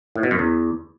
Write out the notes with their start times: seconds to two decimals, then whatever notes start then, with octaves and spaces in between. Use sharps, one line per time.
0.16 A2
0.23 B2
0.31 F#2
0.39 E2